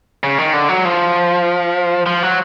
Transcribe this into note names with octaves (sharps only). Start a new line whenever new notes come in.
C#3
D#3
D3
F#3
F3
F3
F#3